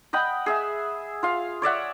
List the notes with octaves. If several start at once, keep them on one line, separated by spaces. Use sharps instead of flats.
D#5 F#5 G5 B5
G#4 E5
F4 F5
C#5 D5 E5 F#5